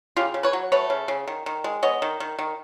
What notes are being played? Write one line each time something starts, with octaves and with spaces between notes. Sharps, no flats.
C#3 F4 G4
C#3
B4 C#5
F#3
A3 B4 C#5
C#3
C#3
D#3
D#3
G#3
B3 C#5 D#5
D#3
D#3
D#3